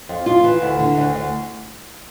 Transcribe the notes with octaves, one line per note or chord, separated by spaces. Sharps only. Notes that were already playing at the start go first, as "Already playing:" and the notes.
F2
F4
E3
D2
D3
D2
D2